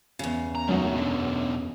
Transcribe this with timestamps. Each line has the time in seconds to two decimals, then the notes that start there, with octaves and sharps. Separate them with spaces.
0.19 E2 C#3
0.55 A#5
0.68 F#2 F#3 A3 D#4
0.95 B2 D3